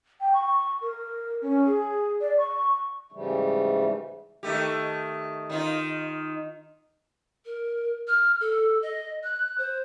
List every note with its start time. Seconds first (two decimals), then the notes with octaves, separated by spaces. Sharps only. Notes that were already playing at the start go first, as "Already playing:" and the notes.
0.21 G5
0.34 C#6
0.82 A#4
1.42 C#4
1.67 G#4
2.21 D5
2.38 C#6
3.12 G#2 C#3 E3 G3 A3
4.43 D#3 A3 G4
5.50 D#3 D#4 F4
7.46 A#4
8.08 F6
8.41 A4
8.82 D#5
9.24 F#6
9.58 C5